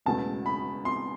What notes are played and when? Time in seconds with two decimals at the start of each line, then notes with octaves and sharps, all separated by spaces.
0.06 E1 E2 C#3 F#3 A3 A5
0.46 B5
0.85 C6